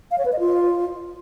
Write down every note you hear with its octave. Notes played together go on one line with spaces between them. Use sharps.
F5
C#5
B4
D#5
F4